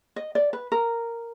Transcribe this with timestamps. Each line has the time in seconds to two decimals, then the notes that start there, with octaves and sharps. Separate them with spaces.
0.16 D#5
0.35 D5
0.53 B4
0.72 A#4